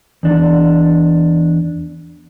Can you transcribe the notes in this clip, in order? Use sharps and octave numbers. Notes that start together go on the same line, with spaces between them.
E2 D4